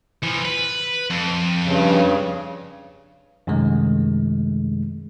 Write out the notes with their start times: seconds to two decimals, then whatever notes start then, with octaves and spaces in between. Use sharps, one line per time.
0.23 E3 F3
0.45 B4
1.11 F2
1.66 G2 C#3
3.47 F#2 C3 D#3 G#3 A3